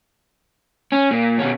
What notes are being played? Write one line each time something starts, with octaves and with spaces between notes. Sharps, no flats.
C#4
A#2
B2 C#4